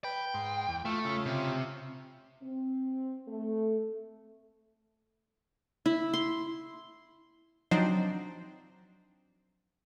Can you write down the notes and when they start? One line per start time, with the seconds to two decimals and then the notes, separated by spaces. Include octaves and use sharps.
0.04 B4 G5
0.34 G#2 C6
0.68 E2
0.85 A3 F4 E5
1.05 C#3 F4
1.26 C3
2.43 C4
3.28 A3
5.86 E4
6.13 C6
7.71 F3 F#3 C4 D4 D#4 C5